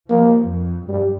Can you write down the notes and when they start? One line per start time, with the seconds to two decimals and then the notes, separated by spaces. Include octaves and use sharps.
0.10 F3 A#3
0.49 F2
0.89 G2 G3